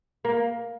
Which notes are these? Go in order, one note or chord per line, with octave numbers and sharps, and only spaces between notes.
A#3